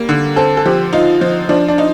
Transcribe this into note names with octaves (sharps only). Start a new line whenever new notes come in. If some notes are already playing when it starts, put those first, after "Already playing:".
Already playing: G3 A#3
D3
C4 A4
A4
F3 G4
D#4 F4
F3
F3 D4
D4
D#4